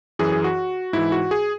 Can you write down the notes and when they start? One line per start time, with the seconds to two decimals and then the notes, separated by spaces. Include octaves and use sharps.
0.19 F#2 E3 G#4
0.32 G#4
0.44 F#4
0.93 G#2 E3 E4
1.12 F#4
1.31 G#4